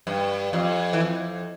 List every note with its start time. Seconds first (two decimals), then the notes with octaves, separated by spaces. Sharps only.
0.07 G2
0.53 F2
0.93 E3
1.00 F2